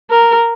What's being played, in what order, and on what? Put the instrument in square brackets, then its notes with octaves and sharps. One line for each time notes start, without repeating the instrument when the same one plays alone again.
[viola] A#4